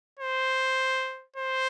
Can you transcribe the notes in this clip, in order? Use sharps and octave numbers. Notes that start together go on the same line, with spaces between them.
C5
C5